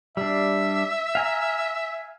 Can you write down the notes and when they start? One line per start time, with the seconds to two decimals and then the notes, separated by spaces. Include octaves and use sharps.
0.17 G3 D4 E5
1.15 F5 G#5 A#5